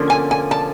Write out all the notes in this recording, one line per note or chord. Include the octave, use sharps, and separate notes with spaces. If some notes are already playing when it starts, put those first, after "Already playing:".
Already playing: D3 F3 A#3 C#4
G#5
G#5
A5